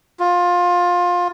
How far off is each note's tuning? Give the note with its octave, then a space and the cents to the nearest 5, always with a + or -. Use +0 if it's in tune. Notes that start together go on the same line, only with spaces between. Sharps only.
F4 +20